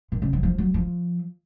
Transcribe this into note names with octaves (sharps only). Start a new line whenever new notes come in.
A#2
C#3
F3
F3
F#3
F3